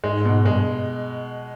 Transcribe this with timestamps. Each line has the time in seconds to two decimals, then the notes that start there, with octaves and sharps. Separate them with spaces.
0.04 G#2 G#3
0.25 B2
0.45 G2 G#3